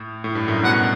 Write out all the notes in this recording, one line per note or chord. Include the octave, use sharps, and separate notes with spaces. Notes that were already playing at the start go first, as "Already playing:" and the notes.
Already playing: A2
A2
G2
F#2 A2
G2 B2 F#5